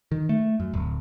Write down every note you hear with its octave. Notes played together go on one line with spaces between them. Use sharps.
D#3
A3
F#2
D1